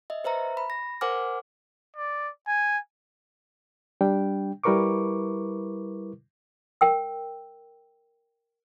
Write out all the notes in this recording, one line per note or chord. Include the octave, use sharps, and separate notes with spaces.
D#5 E5
B4 C5 E5 A#5
B5
A#6
A#4 C5 F#5 G#5 D6 F6
D5
G#5
G3 D4 G5
G3 E4 A#4 B4 C#6 D6
A#4 G5 E6